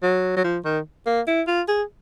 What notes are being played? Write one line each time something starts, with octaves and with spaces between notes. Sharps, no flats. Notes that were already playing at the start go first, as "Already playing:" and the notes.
F#3
F#3
F3
D#3
A#3
E4
F4
G#4